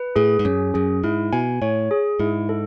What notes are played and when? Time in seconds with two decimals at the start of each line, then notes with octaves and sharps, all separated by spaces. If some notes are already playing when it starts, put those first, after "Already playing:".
Already playing: B4
0.16 A2 G#4
0.39 G#2
0.45 F#2 C#4
0.74 F#2 G#4
1.04 G#2 E4
1.33 B2 G#5
1.62 A2 C#5
1.91 G#4
2.20 G#2 E4
2.49 A4